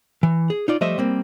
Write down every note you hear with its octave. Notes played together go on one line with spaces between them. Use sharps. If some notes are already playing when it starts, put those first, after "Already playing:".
E3
G#4
D#4 F4 D5
F3 G3 A3 C5 D#5 E5
G3 A#3 C4